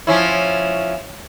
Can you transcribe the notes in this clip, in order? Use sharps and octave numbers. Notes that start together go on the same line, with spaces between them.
F3 C#4 E4